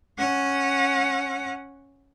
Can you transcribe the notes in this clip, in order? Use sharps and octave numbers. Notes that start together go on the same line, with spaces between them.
C#4 F#5